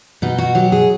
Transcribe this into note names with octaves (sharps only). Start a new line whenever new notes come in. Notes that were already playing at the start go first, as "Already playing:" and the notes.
B2 D#4
F#4
F#3 G4
G#4